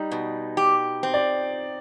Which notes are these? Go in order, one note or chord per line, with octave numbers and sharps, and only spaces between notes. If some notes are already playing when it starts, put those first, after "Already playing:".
Already playing: G3 D#4
B2
G4
C4
D5